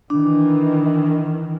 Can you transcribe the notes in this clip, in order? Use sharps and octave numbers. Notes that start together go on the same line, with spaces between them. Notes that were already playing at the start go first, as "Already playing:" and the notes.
D#3 E3 D4